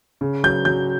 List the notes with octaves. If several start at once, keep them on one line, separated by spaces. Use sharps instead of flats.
C#3
F#3 G6
F#3 G6